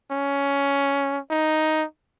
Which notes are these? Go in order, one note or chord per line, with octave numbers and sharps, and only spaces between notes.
C#4
D#4